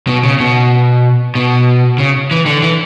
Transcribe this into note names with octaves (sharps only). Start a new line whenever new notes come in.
B2
C#3
B2
B2
C#3
E3
D3
E3